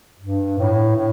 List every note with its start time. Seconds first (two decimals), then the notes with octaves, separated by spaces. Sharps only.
0.20 G2
0.59 A2
0.96 A2